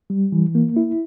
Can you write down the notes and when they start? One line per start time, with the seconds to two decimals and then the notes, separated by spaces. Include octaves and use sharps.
0.10 G3
0.32 E3
0.55 A#3
0.77 E4